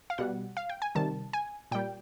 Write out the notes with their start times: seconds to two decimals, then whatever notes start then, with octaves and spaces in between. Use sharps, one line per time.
0.10 F5
0.18 B2 G3 F#5
0.57 F5
0.69 G5
0.82 G#5
0.95 C3 D#3 G3 A5
1.33 G#5
1.71 A#2 G3 G5